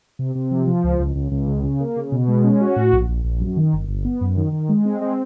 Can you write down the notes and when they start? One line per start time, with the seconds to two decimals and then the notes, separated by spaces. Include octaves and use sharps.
0.19 C3
0.35 C3
0.51 F3
0.67 F3
0.84 C#2
0.99 C#2
1.16 C#2
1.31 C#2
1.48 C#3
1.64 C#3
1.80 A#3
1.96 C#3
2.12 B2
2.28 G#3
2.44 C#4
2.61 F#4
2.76 A2
2.92 A#1
3.09 A#1
3.24 A#1
3.40 F#2
3.57 D#3
3.73 G1
3.88 G1
4.05 B3
4.21 F#2
4.37 D#3
4.52 D#3
4.69 G#3
4.85 C4
5.01 G#3